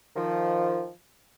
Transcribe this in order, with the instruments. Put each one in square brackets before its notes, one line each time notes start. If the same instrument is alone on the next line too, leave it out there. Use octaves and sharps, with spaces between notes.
[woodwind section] D#3 F3